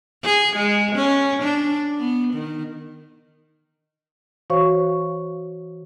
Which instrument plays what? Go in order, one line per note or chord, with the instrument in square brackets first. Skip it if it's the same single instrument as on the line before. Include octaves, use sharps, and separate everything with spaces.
[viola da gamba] G#4
G#3
C#4
D4
B3
D#3
[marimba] E3 F#4 C5 C#5 F5 C#6